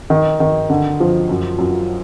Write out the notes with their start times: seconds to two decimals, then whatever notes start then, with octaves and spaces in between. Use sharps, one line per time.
0.10 D#3
0.40 D#3
0.70 D3
1.00 F3
1.29 F#2
1.59 F#2